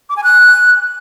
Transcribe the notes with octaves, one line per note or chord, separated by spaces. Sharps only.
D6
G#5
F#6